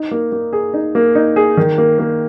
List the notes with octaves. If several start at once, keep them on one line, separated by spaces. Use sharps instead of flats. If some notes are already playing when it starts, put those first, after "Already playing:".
Already playing: D#4
A#3
A#3
G#4
D#4
A#3
D#4
G#4
D#3
A#3
A#3